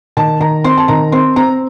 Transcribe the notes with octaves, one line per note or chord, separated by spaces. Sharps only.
D#3 A5
D#3 A#5
C4 C6
A5
D#3 A#5
C4 C6
C4 A#5